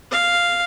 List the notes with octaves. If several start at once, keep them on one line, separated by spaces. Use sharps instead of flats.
F5